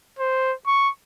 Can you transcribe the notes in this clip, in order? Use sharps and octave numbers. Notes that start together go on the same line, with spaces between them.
C5
C#6